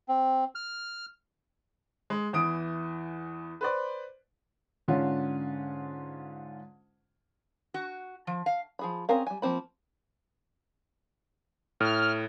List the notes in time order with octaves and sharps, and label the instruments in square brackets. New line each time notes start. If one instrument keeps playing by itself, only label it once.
[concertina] C4
F6
[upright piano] G#3
E2 E3 D#6 D7
B4 C5 D5
[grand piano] G#2 D3 C#4 F4
[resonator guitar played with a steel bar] F#4
F3
F5
[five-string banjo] F3 G#4 B5
C4 C#4 G#4 A#4 F5
G3 G#5
F3 A#3 C4 B5
[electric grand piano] A2 [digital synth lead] F6